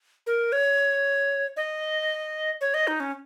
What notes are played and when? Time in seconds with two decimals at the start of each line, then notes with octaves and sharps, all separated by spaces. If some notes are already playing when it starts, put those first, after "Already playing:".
0.27 A#4
0.52 C#5
1.57 D#5
2.61 C#5
2.74 D#5
2.87 D#4
3.00 C#4